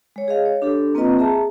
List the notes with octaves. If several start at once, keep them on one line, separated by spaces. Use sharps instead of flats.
G#3 C#5
G#4 D#5 F5
C#5
D4 G4 A4
A#3 C4 F4 B4 D#5 A#5
G#4 E5 A5 A#5